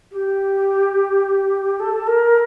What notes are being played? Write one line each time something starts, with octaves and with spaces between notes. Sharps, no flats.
G4
A4
A#4